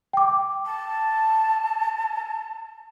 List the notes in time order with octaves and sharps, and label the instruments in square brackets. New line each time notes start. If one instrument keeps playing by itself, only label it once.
[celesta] G5 D6
[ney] A5